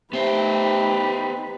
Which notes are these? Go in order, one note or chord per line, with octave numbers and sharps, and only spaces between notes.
A3 B3 D#4 G4 B4 C5